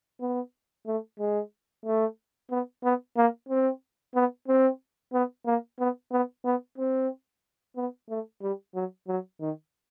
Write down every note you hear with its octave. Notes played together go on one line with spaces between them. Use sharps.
B3
A3
G#3
A3
B3
B3
A#3
C4
B3
C4
B3
A#3
B3
B3
B3
C4
B3
A3
G3
F#3
F#3
D#3